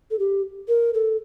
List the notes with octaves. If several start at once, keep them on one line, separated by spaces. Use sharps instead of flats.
A4
G4
A#4
A4